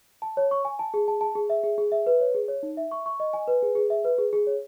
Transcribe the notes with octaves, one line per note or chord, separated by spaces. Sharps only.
A5
C#5
C#6
G#5
A5
G#4
A5
A5
G#4
E5
G#4
G#4
E5
B4
C#5
G#4
C#5
D#4
E5
C#6
C#6
D#5
G#5
B4
G#4
G#4
E5
B4
G#4
G#4
C#5